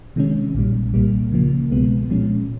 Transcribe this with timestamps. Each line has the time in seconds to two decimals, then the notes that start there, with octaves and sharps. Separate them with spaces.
0.16 C3 D#3 G#3 C#4
0.55 A#1 A#2 G3
0.94 C2 A#2 G3 A#3
1.32 C#3 F3 A#3
1.70 C2 B2 G#3 B3
2.09 A#2 F3 G#3 C#4